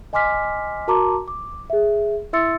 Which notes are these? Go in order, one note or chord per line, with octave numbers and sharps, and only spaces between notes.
D#5 G#5 C6 D6 F6 B6
F#4 A#4 A5 A#5 C6 D6
D6
G#4 E5
E4 E5 C6 E6 A6 C#7